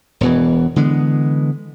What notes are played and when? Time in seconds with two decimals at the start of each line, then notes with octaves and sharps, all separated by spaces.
0.21 E1 B2 E3
0.76 D3 E3 G#3 B3